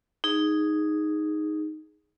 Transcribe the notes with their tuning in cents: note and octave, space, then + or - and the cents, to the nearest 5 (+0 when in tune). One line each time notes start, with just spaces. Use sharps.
D#4 +0 G#4 +0